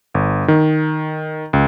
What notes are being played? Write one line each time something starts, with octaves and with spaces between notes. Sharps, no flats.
G1
D#3
C#2